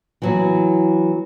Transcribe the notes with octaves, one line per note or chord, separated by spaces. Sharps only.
E3 F#3 B3